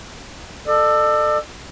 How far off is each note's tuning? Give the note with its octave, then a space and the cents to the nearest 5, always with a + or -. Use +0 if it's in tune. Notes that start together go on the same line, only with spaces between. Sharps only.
A4 +5 D5 +45